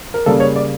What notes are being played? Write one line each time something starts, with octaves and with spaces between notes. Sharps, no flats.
A#4
C#3 G3 A#3 A4
C#5
D5